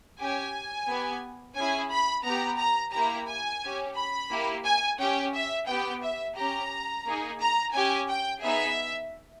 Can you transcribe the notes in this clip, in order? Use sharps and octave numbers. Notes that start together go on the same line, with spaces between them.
C#4 G4 G#5
B3 G4
C#4 E4 G#4 G#5
B5
B3 G4 A#5
A#5
A#3 E4 G4 A#5
G#5
C#4 G4
B5
A#3 E4 G4
G#5
C#4 G4 G5
E5
B3 G4 G5
E5
C#4 G4 A#5
A#3 D#4 G#4
A#5
C#4 G4 G#5
G5
B3 D#4 G#4 E5